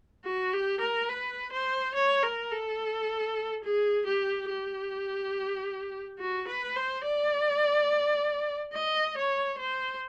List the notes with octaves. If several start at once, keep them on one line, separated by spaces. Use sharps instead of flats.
F#4
G4
A#4
B4
C5
C#5
A#4
A4
G#4
G4
G4
F#4
B4
C5
D5
D#5
C#5
C5